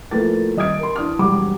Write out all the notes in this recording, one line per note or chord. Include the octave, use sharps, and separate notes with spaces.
A2 F3 A#3 A4 B4 A6
D#1 D#5 D#6 F6 G#6 D7
A#4 C6
E3 D4 D#6 F6
E1 G#2 F#3 G3 G4 D6